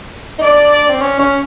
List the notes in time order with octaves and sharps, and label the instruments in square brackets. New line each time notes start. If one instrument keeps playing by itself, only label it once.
[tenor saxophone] D#4
[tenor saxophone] D4 [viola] D5
[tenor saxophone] C4
C#4
C#4